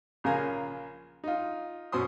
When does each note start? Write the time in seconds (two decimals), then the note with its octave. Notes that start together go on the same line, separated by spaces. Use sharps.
0.24 A#1 C#3 F4 A#4 G#5 A#5
1.24 D#4 F4
1.92 F#2 B2 C5 C6 D#6